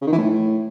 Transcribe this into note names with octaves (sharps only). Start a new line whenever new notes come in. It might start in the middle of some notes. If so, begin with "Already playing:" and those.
C#3
D#3
E3
A2